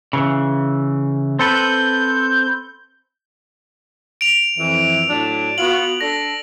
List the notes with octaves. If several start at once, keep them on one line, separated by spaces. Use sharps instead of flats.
C#3 E3
C4 A4 B4 G6
D7 F7
F2 E3
A2 F#3 D4
B3 F4 F#4 F#7
D4 A4 A#6